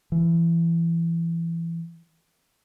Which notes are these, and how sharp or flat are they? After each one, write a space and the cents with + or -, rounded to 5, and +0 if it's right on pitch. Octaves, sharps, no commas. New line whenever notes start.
E3 +25